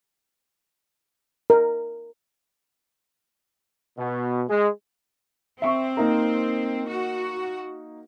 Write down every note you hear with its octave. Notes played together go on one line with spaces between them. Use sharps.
A#4
B2
G#3
C4 E5 C#6
A#3 D#4 A#4
F#4